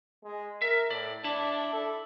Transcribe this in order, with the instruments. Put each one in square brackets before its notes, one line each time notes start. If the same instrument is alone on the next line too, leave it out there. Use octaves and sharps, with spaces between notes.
[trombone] G#3
[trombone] A#4 [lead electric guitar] E5
[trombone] A2 [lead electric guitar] D5
[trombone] D4 [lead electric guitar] E4 A5
[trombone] A4